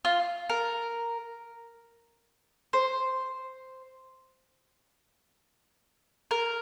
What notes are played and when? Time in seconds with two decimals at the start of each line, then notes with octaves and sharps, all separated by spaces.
0.05 F4
0.50 A#4
2.73 C5
6.31 A#4